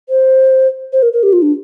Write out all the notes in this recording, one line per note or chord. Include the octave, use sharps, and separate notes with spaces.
C5
C5
A#4
A#4
G4
F4
D4